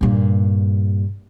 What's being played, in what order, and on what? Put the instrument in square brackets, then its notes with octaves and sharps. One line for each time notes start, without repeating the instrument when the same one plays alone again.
[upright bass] G2 A#2